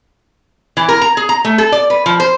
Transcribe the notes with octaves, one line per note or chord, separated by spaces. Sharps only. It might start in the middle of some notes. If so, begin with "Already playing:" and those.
E3
A#4
A#5
G#4
A#5
A3
A4
D5
B4
F3
C5